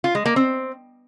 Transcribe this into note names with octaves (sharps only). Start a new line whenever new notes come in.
F4
G#3
A#3
C4